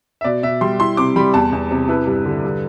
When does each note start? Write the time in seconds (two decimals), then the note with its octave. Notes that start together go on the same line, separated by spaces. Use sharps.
0.21 E5
0.24 B2 D5
0.43 B2 E5
0.61 G3 C6
0.80 E4 C6
0.97 C3 D6
1.16 G3 B5
1.34 E2 A5
1.53 E2
1.71 C3
1.88 E4 B4
2.07 G2
2.26 D3
2.43 G2